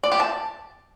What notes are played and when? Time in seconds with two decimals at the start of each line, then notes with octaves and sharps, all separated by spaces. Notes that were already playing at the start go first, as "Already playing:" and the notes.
0.03 D5
0.12 G4
0.20 A5